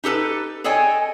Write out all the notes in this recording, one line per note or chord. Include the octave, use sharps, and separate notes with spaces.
D#4 G4 A4 B4
G#4 A4 C#5 D#5 G5 G#5